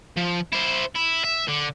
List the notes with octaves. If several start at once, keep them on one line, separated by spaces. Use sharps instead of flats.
F3
E4 C5
E4
E5
D3